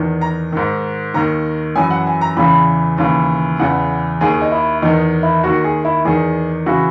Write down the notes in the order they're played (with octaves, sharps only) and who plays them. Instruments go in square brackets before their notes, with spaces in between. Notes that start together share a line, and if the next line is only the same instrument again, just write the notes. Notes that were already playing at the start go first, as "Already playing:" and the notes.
Already playing: [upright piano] E2 D#3
A#5
G#2 D#3
D#2 D#3 A#5
F#2 E3 G#5
F#5
G#5
A#5
E2 C#3 E3 B5
D#2 C#3 E3
E2 C#3 E3 F#5
D#2 D#3 G#4
D#4
E4
E2 D#3 D#4
E4
D#2 D#3 F#4
G#4
E4
E2 D#3 G#4
C#3 E3 F#4